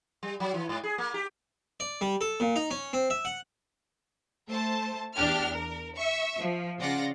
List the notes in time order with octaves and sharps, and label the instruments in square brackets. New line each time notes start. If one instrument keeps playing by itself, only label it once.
[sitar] G3
F#3
E3
G#2
G#4
A#3
G4
[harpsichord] D5
G3
A4
A#2
D#4
C#4
C4
E5
F#5
[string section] A3 C5 A5
E2 D4 G4 F6
A#4
E5 C#6
F3
C#3 F4 D5 F#5 A#6